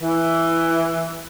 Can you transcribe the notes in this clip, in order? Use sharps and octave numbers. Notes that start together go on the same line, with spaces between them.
E3